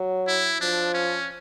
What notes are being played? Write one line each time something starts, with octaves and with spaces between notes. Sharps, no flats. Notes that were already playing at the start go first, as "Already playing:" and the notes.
Already playing: F#3
E4
F3 D4
C#4